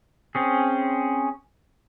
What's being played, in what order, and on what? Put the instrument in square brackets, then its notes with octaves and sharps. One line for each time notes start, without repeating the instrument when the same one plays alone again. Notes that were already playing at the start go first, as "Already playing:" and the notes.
[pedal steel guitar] C4 C#4 G#4